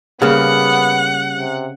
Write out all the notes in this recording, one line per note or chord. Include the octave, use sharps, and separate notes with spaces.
C#3 G3 A#3 B3 C#4 F#5
C3